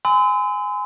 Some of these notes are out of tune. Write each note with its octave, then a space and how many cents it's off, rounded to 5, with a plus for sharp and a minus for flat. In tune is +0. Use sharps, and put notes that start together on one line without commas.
G#5 +0 C6 -45 E6 -35